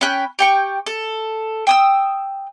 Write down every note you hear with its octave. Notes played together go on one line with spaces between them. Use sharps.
C#4 G5 B5 F#6
G4 G5 C#6
A4
G5 D#6 E6